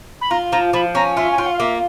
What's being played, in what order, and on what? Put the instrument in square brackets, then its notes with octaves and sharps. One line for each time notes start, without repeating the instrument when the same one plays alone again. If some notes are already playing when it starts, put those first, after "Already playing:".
[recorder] B5
[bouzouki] F4 [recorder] A#5
[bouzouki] F3 [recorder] A#5
[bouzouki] F3 [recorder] B5
[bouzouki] C#4 [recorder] A#5
[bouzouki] F4 [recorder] E5
[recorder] G#5
[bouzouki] F4 [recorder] G5
[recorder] F#5
F5
[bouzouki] A#3 [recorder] E5